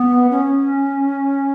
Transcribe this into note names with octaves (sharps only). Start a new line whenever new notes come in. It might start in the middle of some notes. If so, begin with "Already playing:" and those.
Already playing: B3
C#4